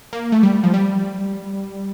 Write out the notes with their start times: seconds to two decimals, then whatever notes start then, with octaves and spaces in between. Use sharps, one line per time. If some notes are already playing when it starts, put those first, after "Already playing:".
0.13 A#3
0.32 A3
0.43 G3
0.63 F3
0.74 G3